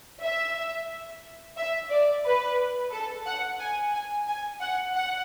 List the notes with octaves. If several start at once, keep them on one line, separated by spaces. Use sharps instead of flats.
E5
E5
D5
B4
A4
F#5
G#5
G#5
G#5
F#5
F#5